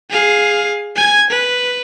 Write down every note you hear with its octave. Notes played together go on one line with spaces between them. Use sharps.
G#4 F5
G#5 G#6
B4